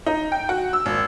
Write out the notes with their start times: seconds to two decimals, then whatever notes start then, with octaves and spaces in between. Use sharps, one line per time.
0.06 D#4
0.32 G5
0.49 F#4
0.73 E6
0.86 G#1